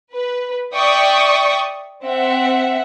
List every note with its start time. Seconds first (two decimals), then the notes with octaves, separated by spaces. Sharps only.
0.14 B4
0.73 D5 E5 G5 C#6 D#6
2.02 C4 E5 F#5